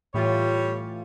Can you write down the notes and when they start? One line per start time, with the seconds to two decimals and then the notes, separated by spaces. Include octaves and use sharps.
0.14 A2 E3 G3 F4 C#5